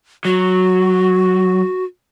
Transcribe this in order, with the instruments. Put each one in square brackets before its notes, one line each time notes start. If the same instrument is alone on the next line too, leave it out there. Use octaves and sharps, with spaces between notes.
[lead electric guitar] F#3 [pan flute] F#4